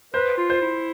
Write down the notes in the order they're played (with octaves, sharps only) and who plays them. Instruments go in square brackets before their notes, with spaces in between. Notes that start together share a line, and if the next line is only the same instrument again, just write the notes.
[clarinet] B4 [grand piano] C5
[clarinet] F4
[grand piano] C5
[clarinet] E4